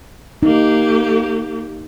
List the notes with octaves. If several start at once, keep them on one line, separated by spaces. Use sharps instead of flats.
A#3 D#4 G4